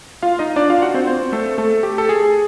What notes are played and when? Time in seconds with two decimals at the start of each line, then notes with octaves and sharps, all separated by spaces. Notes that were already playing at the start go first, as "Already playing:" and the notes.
0.23 F4 F5
0.39 D#4 D#5
0.56 D4 D5
0.70 F4 F5
0.82 F#4 F#5
0.94 C4 C5
1.07 C4 C5
1.32 A3 A4
1.58 A3 A4
1.83 G4
1.98 A4
2.09 G#4